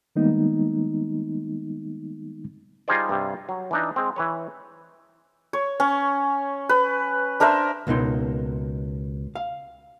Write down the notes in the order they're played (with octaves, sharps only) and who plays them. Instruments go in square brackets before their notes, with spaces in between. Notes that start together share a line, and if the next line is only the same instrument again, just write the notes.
[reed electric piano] D#3 G3 G#3 A#3 B3 D#4
[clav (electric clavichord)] G3 D#4 F4 G#4 C5 D5
G2 C3 G3
F#3
E3 D4 D#4
G#3 C4
E3 B4 C#5
[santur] C#5
C#4
B4
D4 A#4 C5 E5
[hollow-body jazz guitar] C#2 B2 A#3 D#4 C6
F5